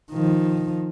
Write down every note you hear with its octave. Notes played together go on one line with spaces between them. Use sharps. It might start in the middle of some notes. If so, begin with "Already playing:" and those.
D#3 F3